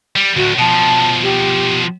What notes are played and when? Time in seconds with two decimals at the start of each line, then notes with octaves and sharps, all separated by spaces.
0.16 G3
0.37 D2 A2 F#4
0.59 B2 F3 A5
1.23 G4